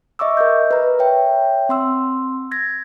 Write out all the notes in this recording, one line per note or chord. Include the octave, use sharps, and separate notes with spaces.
D#5 E5 C#6 D6 E6
A#4 D#5 G6
B4 A#5
C#5 E5 G5
C4 C6 E6
G#6 A#6